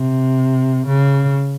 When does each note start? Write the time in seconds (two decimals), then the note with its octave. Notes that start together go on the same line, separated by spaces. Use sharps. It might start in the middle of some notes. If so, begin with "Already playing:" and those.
Already playing: C3
0.87 C#3